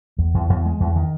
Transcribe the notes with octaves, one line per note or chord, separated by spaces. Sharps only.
E2
E2
E2
G#3
E2
D#3